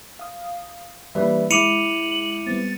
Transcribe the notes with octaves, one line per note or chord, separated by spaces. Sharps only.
F5 D#6
E3 G3 A#3 D4 B4 E5
G#3 E4 D6 C#7 D#7 F7 F#7
G3 B3 C4 A6